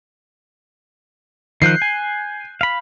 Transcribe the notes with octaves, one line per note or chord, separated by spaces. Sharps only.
D#3 F3 F#6 G6 C7
G#5
F5 B5